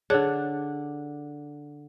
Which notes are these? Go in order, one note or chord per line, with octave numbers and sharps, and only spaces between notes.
D3 D4 G#4 C#5 F#6